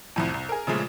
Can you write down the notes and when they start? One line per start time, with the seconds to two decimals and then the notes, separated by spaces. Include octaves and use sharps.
0.16 C2 F2 A2
0.34 C2
0.49 G#4 A#4
0.67 A#2 C#3 F3 G#3 A3